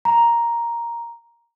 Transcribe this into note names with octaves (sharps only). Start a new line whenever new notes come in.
A#5